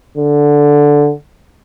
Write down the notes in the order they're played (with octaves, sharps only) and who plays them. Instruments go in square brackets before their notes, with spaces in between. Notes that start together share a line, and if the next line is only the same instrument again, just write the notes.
[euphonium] D3